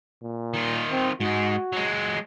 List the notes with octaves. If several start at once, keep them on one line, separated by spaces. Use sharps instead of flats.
A#2
D#3 F4
C4
G#2 G#3 F#4
F#3 G#3